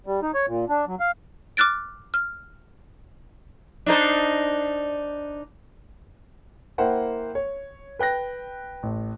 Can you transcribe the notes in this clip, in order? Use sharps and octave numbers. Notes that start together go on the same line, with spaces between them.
G3
D#4
C#5
A#2
D4
F#3
F5
D6 F6 F#6 A6 D7
F6
D4 D#4 C5
A#3 E4 C5 F#5 G5
C#5
B4 G5 F#6 A#6
A1